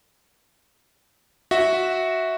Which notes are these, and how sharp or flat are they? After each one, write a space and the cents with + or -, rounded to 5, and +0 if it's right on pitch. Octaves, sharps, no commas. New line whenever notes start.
F#4 +0 E5 -15